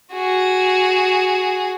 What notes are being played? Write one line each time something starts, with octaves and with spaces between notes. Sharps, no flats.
F#4 G#4